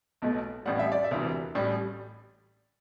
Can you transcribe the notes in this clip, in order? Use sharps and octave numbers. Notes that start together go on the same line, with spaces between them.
B1 B2 A3
A1 A2 G3 F#5
E5
D5
E5
E1 D2 C3 E3
A1 A2 G3